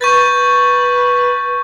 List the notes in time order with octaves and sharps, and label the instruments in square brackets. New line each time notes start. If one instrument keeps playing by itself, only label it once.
[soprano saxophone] B4 [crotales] C#6 G6 A6